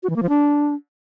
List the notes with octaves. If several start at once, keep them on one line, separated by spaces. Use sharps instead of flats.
F#4
E3
A#3
F3
D4